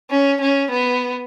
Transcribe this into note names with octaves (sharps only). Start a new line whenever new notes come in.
C#4
C#4
B3